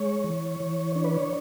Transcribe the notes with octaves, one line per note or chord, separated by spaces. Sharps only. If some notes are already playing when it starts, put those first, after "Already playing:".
Already playing: G#3 C#5
E3
E3
D4 C#5
B4
C#5